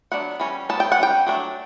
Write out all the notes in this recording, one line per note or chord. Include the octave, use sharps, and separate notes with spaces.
F#3 B3 D4 F#5
E3 G3 C#4
F#3 B3 A5
G5
F#5
G3 C#4 G5
F#3 A3 D4